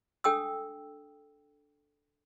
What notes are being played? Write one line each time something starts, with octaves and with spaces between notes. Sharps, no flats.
D4 A4 G5 D#6 E6